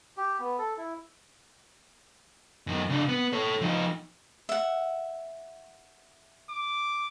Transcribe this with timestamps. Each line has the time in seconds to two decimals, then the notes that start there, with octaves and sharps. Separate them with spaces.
0.17 G4
0.40 B3
0.58 A4
0.78 E4
2.67 F#2 D#3
2.89 C#3 D4
3.09 B3
3.33 A4 C#5
3.61 F3 D#4
4.49 E5 F#5
6.50 D6